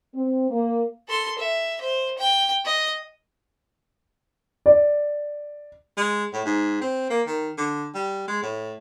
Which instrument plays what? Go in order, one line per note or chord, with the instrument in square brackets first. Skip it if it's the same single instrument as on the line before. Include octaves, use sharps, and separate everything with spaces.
[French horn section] C4
A#3
[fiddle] A4 C6
E5
C5
G5
D#5
[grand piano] D5
[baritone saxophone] G#3
A2
G#2
C4
A#3
D#3
D3
G3
G#3
A2